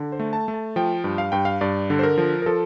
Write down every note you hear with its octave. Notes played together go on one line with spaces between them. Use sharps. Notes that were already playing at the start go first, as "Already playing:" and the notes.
Already playing: D3
C5
A3
A5
A3
A5
F3 G5
G2
F5
G2 G5
F5
G2 D5
D3
C5
A#4
F3
A#4
F3 A4